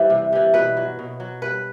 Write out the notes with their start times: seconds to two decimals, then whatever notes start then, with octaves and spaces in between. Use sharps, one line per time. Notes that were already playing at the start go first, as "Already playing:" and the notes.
Already playing: G2 E3 G3 C5
0.10 C3
0.33 E3 G3
0.54 B2 B4
0.77 F#3
0.99 B2
1.20 F#3
1.42 G2 B4